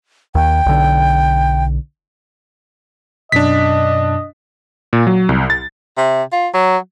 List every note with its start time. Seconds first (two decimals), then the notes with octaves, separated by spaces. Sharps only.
0.35 D#2 G5
0.66 B1 D3
3.32 F#2 B2 D4 D#5 B6
4.93 A#2
5.07 F#3
5.29 C2
5.50 A6
5.97 C3
6.33 F4
6.54 F#3